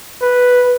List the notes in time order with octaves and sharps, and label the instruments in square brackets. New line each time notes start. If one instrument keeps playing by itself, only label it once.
[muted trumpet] B4